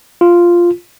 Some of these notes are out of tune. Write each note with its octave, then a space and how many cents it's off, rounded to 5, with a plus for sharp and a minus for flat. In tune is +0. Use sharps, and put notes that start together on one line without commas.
F4 -5